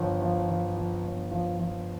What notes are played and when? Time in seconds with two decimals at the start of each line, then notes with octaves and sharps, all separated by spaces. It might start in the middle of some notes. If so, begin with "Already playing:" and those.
Already playing: G1 F3
0.21 F3
0.49 F3
0.76 F3
1.04 G1
1.31 F3
1.59 F3